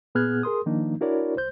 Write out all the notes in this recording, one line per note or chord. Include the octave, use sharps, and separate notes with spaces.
A#2 B3 G#4 F6 F#6 G#6
G#4 A#4 C6 D#6
D#3 F3 A#3 D4 D#4
D4 E4 F#4 A#4 C#5 D5
C2 C5 G6